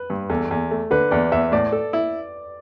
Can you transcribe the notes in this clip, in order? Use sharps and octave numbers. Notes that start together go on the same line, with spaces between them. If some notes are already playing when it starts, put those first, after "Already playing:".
Already playing: B4
G2
E2 A4
E2
A3
D3 B4
E2 D5
E2 E5
A2 D5
A4
E4